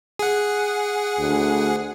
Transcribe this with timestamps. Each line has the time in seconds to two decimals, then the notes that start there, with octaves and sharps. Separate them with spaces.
0.19 G#4 F#5
1.19 D2